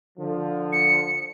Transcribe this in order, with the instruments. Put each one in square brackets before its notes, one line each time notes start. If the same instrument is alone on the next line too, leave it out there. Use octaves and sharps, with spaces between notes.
[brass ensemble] D3 F3
[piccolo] C#7